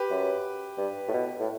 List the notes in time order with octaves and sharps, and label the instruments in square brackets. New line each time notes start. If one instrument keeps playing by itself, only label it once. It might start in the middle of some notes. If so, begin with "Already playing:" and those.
Already playing: [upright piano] G4 B4
[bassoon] F#2
G2
A2
B2
A2